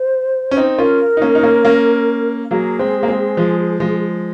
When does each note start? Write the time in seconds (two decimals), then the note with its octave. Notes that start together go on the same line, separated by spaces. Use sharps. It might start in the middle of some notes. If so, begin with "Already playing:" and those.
Already playing: C5
0.51 C#4
0.57 C4 D#4
0.78 C#4 F4 A#4
1.17 D#4
1.22 A#3 C#4
1.35 D#4
1.43 A#3 C#4
1.65 A#3 C#4
2.51 F#3 A#3 G#4
2.79 G#3 C4
3.03 A#3
3.08 G#3 C4
3.37 F3 G#3
3.80 F3 G#3